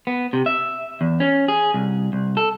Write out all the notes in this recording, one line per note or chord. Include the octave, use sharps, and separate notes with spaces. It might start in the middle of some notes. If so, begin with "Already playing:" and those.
B3
C3
E5
E2
C#4
G#4
C2
C2
A4